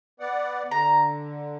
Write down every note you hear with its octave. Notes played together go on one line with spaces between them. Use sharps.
B3 D5 F#5
D3 A#5